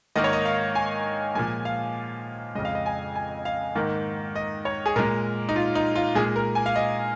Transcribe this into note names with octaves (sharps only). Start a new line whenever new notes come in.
G#2 D#3 A#3 D#5
C#5
D#5
F5
G#5
A#2 F3 G#3 G#5
F5
F2 C#3 G#3 D#5
F5
D#5
G#5
G#5
F5
G#2 D#3 A#3
D#5
C#5
G#4
A#2 G#3 A#4
D#4
F4
D#4
F4
A#2 G#3 G#4
A#4
G#5
F5
D#5